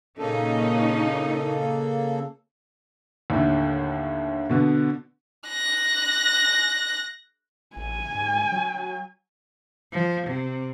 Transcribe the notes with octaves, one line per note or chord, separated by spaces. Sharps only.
A#2 C#3 A#3 C#4 D#4 A4
D#2 A2 D3
B2 D3 B3
F#6 A#6
A1 G#5
G#2
F#3
F3
C3